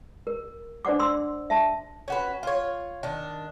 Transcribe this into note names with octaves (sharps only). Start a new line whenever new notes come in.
A#4
D4 C5 D5 F#5 D6
C6 E6
E5 A5
C#4 F#4 B4
F4 C#5
D#3 D4